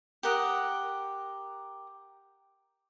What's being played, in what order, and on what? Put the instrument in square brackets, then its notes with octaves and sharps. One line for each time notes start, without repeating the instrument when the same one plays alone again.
[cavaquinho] G4 A#4 F#5 D#6